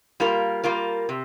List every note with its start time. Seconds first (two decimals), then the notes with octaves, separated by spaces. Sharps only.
0.20 G3 A#3 F4 A#4
0.64 G3 A#3 F4 A#4
1.09 C3